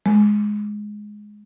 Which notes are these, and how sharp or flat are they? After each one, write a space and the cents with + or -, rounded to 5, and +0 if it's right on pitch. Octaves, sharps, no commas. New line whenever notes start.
G#3 +5